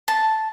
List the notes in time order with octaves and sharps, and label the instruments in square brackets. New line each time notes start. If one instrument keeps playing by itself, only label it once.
[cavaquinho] A5